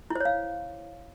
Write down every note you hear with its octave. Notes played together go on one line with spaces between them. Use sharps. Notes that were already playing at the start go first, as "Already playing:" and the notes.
E4 C5 C#5 F5